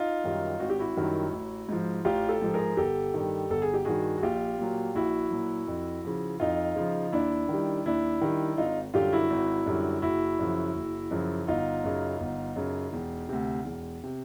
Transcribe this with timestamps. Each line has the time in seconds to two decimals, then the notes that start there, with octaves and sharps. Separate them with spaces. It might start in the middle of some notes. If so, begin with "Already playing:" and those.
Already playing: D#4 F4
0.24 F#2 D#3 G3
0.60 G#1 F#4
0.70 G4
0.79 E4 F#4
0.97 F#2 D#3 G3
1.33 A1
1.69 G#2 F3
2.05 A1 F4 G4
2.29 G4 A4
2.42 G#2 F3
2.54 G#4 A#4
2.77 G1 G4 A4
3.14 G2 D#3
3.50 G1 A4
3.62 G#4
3.74 G4
3.85 G2 D#3 F#4 G#4
4.17 F#4
4.23 A#1 F4 G4
4.58 A#2 F#3
4.95 A#1 E4 F#4
5.31 A#2 F#3
5.68 F2
6.05 C#3 F3
6.40 F2 D#4 F4
6.76 C#3 F3
7.12 D#2 D4 E4
7.49 D#3
7.54 G3
7.86 D#2 D4 E4
8.21 D#3 G3
8.57 G#1 D#4 F4
8.94 F#2 D3 G3 F4 G4
9.13 E4 F#4
9.30 G#1
9.66 F#2 D3 G3
10.02 F#1 E4 F#4
10.39 F#2 C#3 F3
10.75 F#1
11.11 F#2 C#3 F3
11.47 G1 D#4 F4
11.84 F#2 C#3
12.20 G1
12.56 F#2 C#3
12.93 E1
13.29 D2 C3
13.65 E1
14.04 C3